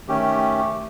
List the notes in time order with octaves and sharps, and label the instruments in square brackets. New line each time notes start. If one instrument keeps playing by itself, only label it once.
[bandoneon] D#3 C#4 G4 [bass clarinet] A3